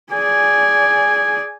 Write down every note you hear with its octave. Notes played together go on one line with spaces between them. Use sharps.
G#4 D5 G#5